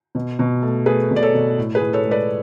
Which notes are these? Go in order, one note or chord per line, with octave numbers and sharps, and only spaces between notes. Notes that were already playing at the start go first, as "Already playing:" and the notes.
B2
B2
A3
A3 G#4 B4
B2
D5
A4 C#5
B2
A2
G#4 B4
A2
A4 C#5
G#3
B4 D5